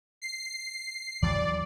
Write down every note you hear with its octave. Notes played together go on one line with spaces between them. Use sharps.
C7
D#2 E3 F#3 D5